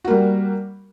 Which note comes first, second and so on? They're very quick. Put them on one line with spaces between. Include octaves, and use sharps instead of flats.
F#4 A#3 G3